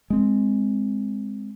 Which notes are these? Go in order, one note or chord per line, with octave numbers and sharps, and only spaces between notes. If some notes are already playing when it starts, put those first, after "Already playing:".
G#3 C4